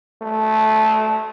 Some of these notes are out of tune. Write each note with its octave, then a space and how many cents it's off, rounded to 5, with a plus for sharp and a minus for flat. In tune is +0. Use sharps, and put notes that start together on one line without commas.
A3 -15